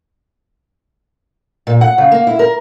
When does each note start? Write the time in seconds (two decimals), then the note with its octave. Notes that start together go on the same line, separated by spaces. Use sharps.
1.67 A#2
1.81 F#5
1.98 C#3
2.12 A#3
2.27 E4
2.39 A#4